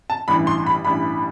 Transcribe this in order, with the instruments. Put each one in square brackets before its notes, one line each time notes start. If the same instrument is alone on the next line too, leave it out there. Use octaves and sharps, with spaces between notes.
[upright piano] A5
A1 G2 E3 G3 B5
C6
B5
A1 G2 E3 G3 B5